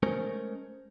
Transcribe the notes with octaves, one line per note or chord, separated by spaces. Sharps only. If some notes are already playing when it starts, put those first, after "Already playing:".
G#3 A3 C#4 A#4 C5